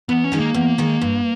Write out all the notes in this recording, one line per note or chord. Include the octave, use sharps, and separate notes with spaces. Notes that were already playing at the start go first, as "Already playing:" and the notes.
E2 B3
C#4
D#3 G#3 D#4
A#3
E2
D#3 G#3 D#4
G2